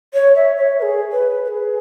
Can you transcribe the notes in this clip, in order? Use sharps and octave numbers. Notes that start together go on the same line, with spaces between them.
C#5
E5
C#5
B4
G#4
B4
B4
G#4